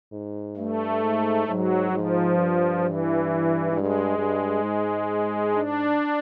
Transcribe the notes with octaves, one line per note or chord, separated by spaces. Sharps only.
G#2
G2 A3
G#2
G#2 F#3
G#2 F3
G2
E3
G2 G#3
G2
G#2
D4